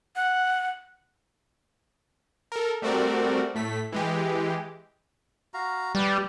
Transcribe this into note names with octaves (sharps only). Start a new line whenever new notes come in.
F#5
A4 A#4
G3 A3 C4 F#4 A#4 D5
A2 A3 B6
E3 G#3 G4
F#4 F5 A#5
G3 B4 D5 G5